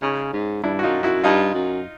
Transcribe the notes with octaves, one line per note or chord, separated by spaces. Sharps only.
C#3 C#4 D#4
G#2
G2 D4 E4
F#4
F#2 D#4 F4
F#2 E4 F#4
G2 D#4 F4
F#2